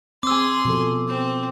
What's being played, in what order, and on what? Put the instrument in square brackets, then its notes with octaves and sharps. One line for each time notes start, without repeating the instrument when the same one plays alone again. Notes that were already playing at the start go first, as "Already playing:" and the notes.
[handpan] C4 [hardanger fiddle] G#4 C6 [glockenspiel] D6 E6
[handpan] B2 F3 A4
[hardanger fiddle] C4